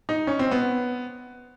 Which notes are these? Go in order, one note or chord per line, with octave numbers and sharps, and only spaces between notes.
D#4
C#4
C4
B3